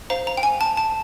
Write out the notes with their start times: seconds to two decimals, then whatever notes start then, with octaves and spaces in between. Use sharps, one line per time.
0.10 C5 F5 A#5
0.27 A#5
0.37 G5
0.43 G#5
0.61 A5
0.77 A5